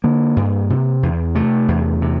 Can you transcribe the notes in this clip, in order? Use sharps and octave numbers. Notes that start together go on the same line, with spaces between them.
D3 A#3
G2
C3
E2
C3 A3
E2
C3